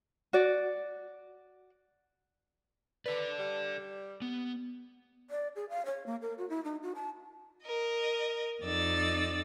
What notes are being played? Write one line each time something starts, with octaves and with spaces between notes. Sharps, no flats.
F#4 D5
A4 B4 D5
G3
B3
D5
G#4
F5
C#5
A#3
A#4
F#4
E4
D#4
F#4
A5
A#4 D#5
F2 D#4 D5 E6 A6